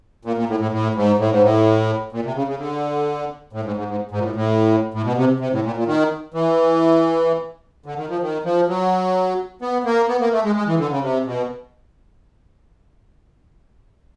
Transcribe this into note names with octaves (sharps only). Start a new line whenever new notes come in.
A#2
A#2
A2
A2
A2
G#2
A2
G#2
A2
A#2
C3
C#3
C#3
D3
A2
G#2
G#2
G#2
G#2
A#2
A2
A2
A2
B2
C3
C3
A2
A#2
A#2
D#3
E3
D3
D#3
F3
D#3
F3
F#3
B3
A#3
B3
A#3
A3
G#3
G#3
E3
D3
C#3
C3
B2